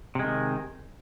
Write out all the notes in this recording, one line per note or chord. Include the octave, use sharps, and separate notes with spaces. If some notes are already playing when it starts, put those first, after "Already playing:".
C3 D#3 G#3